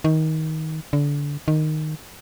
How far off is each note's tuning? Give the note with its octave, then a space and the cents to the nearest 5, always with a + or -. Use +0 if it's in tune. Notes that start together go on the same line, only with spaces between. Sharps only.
D#3 +20
D3 -25
D#3 -10